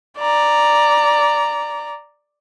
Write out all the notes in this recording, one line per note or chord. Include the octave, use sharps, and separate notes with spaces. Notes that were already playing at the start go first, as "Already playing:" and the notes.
D5 A#5